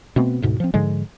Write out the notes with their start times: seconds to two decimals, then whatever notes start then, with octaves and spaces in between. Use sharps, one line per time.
0.16 B2 A3 B3 C4
0.42 D2 G#2 B2
0.60 F3 C4
0.74 G#2 D3 F3 G#3